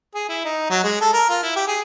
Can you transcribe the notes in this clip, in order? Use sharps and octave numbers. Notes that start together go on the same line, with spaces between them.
G#4
E4
D#4
F#3
G#3
A4
A#4
F4
E4
G4
G#4